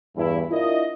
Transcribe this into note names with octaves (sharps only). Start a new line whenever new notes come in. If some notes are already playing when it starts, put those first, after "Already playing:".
E2 G2 E4
D4 E4 F4 A#4 D#5